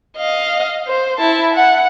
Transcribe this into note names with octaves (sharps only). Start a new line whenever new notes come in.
D#5 F5
C5
E4 A5
F#5